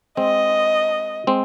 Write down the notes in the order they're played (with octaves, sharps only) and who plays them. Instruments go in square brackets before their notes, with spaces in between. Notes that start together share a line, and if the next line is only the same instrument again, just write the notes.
[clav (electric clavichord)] G#3 C4 [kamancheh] D#5
[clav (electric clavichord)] G#3 C4